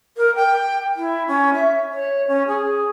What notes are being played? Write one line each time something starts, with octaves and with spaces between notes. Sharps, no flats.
A#4
G5
E4
C#4
E5
C#5
C#4
G#4